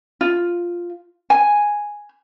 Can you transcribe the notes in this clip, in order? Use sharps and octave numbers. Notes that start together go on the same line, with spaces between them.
F4
G#5